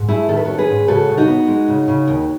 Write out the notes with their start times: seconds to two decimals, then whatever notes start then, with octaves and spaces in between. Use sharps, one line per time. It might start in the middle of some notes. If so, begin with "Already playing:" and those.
Already playing: G#2
0.08 A3 E4 G#4
0.28 D#3 A4
0.37 B4
0.45 C#4 F#4 A4
0.58 G#4 B4
0.69 G#2
0.88 C#3 F#4 A4
1.09 C#3
1.18 D#4 F#4
1.28 B3
1.48 G#3
1.68 C#3
1.88 C#3
2.08 D#2